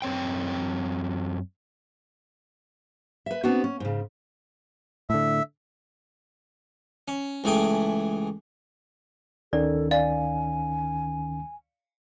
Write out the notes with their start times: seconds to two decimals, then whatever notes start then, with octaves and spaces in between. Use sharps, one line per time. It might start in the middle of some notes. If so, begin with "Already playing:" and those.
0.02 F#2 C4 C#5 G5
3.26 B4 E5
3.44 B3 C4 D4 F#4
3.64 C#4
3.80 G#2 C#3
5.10 A2 D3 E5
7.08 C#4
7.44 C#2 E3 A3 G#4 G5
9.53 D2 D#3 C#4 A4 D5
9.91 D5 F5 G#5